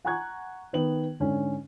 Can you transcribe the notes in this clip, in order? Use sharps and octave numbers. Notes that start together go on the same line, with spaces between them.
F#5 G#5 A#5 C#6 F#6 G#6
D#3 B3 F#7
G#2 D3 C#4